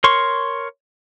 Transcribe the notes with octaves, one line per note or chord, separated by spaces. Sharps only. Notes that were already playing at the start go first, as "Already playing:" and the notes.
A#4 C#5 C6 C#6